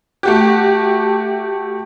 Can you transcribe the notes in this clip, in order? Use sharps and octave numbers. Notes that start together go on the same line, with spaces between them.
A3 F#4 G4